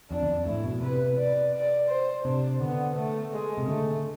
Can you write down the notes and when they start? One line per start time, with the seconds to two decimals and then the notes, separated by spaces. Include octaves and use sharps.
0.11 F2 D4
0.23 E2
0.29 F2
0.46 A2 E4
0.64 B2
0.82 C3 B4
1.18 D5
1.54 D5
1.89 C5
2.25 C3 D4
2.61 D3 B3
2.96 A3
3.33 G#3
3.58 C3
3.68 D3 A3